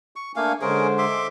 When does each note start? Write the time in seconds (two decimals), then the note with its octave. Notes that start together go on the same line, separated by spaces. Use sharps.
0.16 C#6
0.36 A3 A#3 D4 F5 G#5
0.61 D3 G#3 C#4 G#4 A#4 C5
0.98 E5 C6 D6